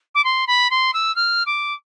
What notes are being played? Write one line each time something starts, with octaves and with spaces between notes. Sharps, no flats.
D6
C6
B5
C6
E6
F6
D6